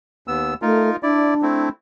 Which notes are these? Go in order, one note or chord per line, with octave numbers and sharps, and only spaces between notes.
D#2 B3 E6
A3 D#4 F4 A#4
D4 E4 D5
A3 C4 E4